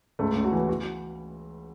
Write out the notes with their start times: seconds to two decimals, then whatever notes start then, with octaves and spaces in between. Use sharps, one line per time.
0.19 C#2 A3
0.35 C#2
0.44 F#4
0.52 E3
0.69 F#4